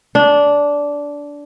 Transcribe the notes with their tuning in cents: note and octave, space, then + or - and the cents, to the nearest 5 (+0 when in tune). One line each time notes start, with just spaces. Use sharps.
D4 -15